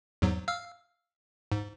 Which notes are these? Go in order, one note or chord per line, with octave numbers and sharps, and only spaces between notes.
E2 G#2 F#3
F5 E6 F6
G#2